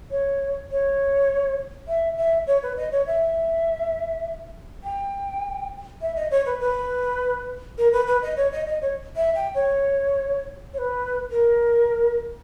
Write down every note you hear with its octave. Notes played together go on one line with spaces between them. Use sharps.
C#5
C#5
E5
E5
C#5
B4
D#5
C#5
E5
G5
E5
D#5
C#5
B4
B4
A#4
B4
B4
D#5
C#5
D#5
D#5
C#5
E5
G5
C#5
C#5
B4
A#4